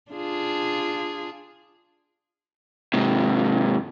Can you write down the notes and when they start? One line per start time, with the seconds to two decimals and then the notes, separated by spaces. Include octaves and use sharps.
0.12 D4 F4 G#4
2.94 G#2 C3